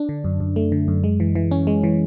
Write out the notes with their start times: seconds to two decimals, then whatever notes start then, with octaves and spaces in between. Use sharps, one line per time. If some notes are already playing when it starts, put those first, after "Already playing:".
Already playing: D4
0.09 D3
0.24 F#2
0.40 F#2
0.56 A3
0.72 D3
0.88 F#2
1.04 G#3
1.20 E3
1.35 E3
1.51 C#4
1.67 G#3
1.84 E3